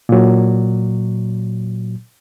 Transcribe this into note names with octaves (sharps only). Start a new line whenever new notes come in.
A#2 F#3